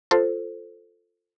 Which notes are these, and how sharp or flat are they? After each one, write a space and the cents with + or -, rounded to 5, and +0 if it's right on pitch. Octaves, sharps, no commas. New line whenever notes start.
F4 +0 A4 +10 C5 +0